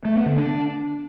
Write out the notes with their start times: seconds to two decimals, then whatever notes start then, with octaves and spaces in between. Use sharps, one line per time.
0.05 A3
0.15 B3
0.26 D3
0.36 D4